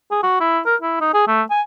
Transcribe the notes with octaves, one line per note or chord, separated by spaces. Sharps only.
G#4
F#4
E4
A#4
E4
D#4
G#4
A3
G#5